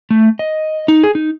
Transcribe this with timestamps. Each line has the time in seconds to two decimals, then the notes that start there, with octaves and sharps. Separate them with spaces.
0.11 A3
0.39 D#5
0.88 D#4
1.03 G#4
1.15 D#4